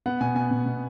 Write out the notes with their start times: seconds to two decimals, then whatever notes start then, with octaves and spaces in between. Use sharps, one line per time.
0.06 B3 F#5
0.21 B2 G#5
0.35 B2 G#5
0.51 B2
0.66 B2